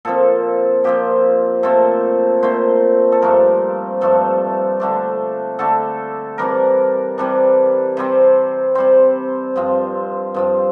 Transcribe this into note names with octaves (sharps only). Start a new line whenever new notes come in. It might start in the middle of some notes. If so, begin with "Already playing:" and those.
A#2 F3 C4 A4
A#2 F3 C4 G4
A#2 A3 C4 A4
A#2 A3 C4 C5
A4
G2 F3 A3 D4 A#4
G2 F3 A3 D4 A4
D3 A3 D4
D3 A3 D4 A4
C3 E3 G3 D4 A#4
C3 E3 G3 D4
C3 G3 C4
C3 G3 C4 C5
G2 F3 C4
G2 F3 C4